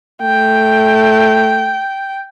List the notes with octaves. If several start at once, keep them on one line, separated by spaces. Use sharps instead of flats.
A3 G5